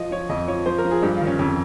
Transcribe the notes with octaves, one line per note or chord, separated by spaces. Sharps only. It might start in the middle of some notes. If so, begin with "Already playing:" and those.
Already playing: F3 D#5
F3 C#5
F2 D#5
F3 C#5
F3 C5
A#4
F3
G#4
G2 G4
F4
D#3
C#4
F2 C#4